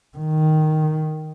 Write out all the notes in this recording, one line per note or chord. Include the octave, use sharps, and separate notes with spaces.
D#3